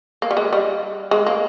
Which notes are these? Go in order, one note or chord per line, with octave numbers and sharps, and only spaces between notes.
A#3
G3
G#3
G3
G#3
A#3